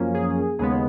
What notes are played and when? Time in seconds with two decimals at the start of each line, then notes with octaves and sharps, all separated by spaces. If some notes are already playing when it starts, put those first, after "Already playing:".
Already playing: F#2 F3 A#3 C#4
0.14 G#4
0.59 D#2 C#3 G#3 B3 G#4